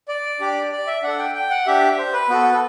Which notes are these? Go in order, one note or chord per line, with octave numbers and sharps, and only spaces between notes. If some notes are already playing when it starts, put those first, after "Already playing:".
D5
D4 G4
D5
E5
D4 A4 F#5
G5
G5
F#5
D4 G4 E5
C5
B4
B3 F#4 A4
A4